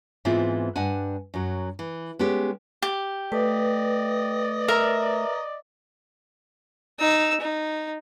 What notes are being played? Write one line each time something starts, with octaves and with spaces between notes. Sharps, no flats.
G#2 E3 B3 C4 E4 F4
G2 D4 F#5 G#5
F#2 F#3
E3
G#3 B3 C#4 G4
G4
A3 B4 D5 D#5
A#4 E5 A#5
D#4 E6
D#4